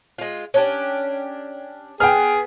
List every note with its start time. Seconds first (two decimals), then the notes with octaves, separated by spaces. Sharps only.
0.18 G#3 F4
0.54 C#4 D4 G4
2.00 B3 G#4 G5 F6